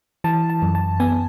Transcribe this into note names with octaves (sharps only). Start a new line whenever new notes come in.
E3 A5
A5
F#2
A5
B3 G#5